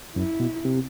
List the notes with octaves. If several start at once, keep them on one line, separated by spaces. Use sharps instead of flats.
F#2 E4
B2
C3